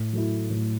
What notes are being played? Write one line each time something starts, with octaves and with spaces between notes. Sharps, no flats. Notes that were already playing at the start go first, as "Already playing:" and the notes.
Already playing: A2
F#3 A3 E4
A2